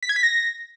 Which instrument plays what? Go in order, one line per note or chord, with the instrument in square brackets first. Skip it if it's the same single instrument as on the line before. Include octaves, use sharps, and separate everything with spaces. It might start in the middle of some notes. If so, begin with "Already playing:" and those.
[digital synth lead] B6
G#6
B6
A#6